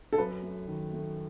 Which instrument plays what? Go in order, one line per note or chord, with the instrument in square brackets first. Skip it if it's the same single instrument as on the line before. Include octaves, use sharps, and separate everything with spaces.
[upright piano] A4
[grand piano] F#2 [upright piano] B4
[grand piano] A3
D#3
A3